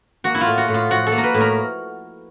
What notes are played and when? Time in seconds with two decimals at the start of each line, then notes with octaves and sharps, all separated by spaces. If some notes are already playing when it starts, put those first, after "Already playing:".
0.24 A#3 F#4
0.35 E4
0.41 F4
0.46 A2
0.58 F#4
0.68 A2
0.74 F4
0.90 F3 F#4
1.07 A4
1.12 A#3
1.18 A#4
1.23 B4
1.34 A2
1.41 A#4